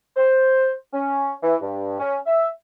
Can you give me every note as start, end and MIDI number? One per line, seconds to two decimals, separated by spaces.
0.16 0.72 72
0.93 1.33 61
1.42 1.56 52
1.61 1.96 43
1.99 2.16 61
2.26 2.48 76